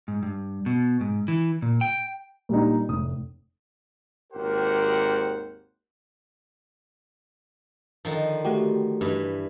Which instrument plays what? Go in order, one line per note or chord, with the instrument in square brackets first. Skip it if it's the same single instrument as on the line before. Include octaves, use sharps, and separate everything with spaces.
[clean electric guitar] G#2
G2
B2
G#2
E3
A#2
G5
[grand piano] A#2 G3 D4 D#4
F1 A2 D#6
[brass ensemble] G#1 D#2 G4 A#4 C5 F#5
[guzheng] D3 D#3 F3
[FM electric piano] A3 F#4 G4
[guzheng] G2 E3